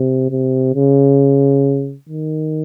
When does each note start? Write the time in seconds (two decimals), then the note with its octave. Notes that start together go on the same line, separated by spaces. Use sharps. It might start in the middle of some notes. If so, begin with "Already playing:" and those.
Already playing: C3
0.30 C3
0.75 C#3
2.09 D#3